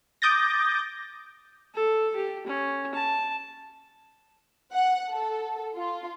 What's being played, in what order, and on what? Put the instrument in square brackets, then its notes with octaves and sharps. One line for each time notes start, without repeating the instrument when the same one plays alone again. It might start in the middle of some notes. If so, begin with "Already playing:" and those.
[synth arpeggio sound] D6 D#6 G6 A6 A#6
[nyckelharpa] A4
G4
C#4
A5
[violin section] F#5
A4
F4